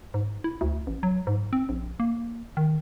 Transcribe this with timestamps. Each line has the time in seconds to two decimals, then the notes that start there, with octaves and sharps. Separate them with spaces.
0.14 G#2
0.44 E4
0.61 D2
0.87 A1
1.03 F#3
1.27 G#2
1.53 C4
1.69 A#1
2.00 A#3
2.57 D#3